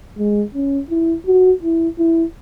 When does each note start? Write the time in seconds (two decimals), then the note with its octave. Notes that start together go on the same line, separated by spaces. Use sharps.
0.18 G#3
0.55 C#4
0.90 E4
1.27 F#4
1.63 E4
1.99 E4